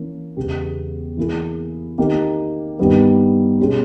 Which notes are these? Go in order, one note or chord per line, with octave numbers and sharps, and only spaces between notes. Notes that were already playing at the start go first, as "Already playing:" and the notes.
Already playing: E3 A#3 C#4
E2 C#3 G#3 B3 G4
E3 A#3 E4 G#4
D#3 A#3 D#4 G4
G2 D#3 G3 B3 D#4
B2 G#3 C#4 G4